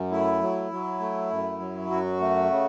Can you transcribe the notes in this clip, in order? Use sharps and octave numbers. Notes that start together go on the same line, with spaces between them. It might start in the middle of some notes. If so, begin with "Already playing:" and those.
Already playing: F#2
A3 E4
F#3
F#3
A3
F#2
F#3
F#2 F#4
A3
C#3